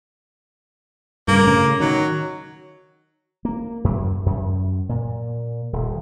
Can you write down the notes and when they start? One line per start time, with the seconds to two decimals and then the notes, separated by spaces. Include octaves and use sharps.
1.28 G2 C#3 A#3
1.44 A2 C#3
1.80 D#3 F#3
3.45 A#3
3.84 F#2
4.26 F#2
4.89 A#2
5.73 D#1